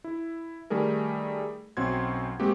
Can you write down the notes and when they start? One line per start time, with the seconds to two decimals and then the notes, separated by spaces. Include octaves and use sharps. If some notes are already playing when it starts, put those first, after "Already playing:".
0.04 E4
0.70 D#3 G3 A3 G#4 A#4
1.77 B1 C4 C#4 F#4 C6 G#6
2.40 G#3 A#3 C4 F#4 G4